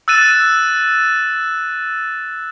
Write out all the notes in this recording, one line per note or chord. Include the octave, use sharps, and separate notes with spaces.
E6 F#6 A6 D#7 E7